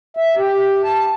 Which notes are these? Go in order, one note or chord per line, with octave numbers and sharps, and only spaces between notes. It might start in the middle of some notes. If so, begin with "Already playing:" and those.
E5
G4
A5